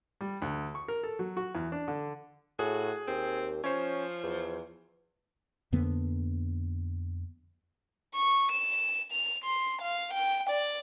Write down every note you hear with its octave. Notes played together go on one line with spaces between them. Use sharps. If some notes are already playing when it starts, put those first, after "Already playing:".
G3
D2
C#6
A#4
A4
F#3
F#4
E2
D4
D3
A2 F#4 G#4
D#2 C4
F3 C#4 C5 C#5
E2
F2 D3 A#3 B3
C#6
E7
F7
C6
F5
G5
D5